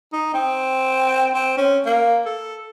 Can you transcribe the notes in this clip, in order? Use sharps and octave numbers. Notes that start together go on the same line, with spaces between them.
D#4
C4
C4
C#4
A#3
A4